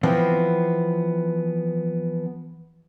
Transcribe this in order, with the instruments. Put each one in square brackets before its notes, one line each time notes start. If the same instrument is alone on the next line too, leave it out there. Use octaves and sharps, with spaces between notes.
[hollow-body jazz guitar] E3 F3 B3 C4